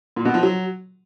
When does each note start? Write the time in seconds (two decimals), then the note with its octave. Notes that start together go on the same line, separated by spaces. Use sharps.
0.16 A#2
0.25 B2
0.34 F3
0.43 F#3